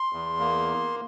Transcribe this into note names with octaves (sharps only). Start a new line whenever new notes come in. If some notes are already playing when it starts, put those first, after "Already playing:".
Already playing: C6
E2
A#3